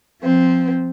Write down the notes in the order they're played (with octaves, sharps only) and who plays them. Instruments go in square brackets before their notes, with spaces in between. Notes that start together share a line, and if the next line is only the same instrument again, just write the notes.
[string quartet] F3 C4